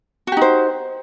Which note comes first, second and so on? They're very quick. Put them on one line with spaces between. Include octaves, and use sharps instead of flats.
F#4 G4 D#4 C5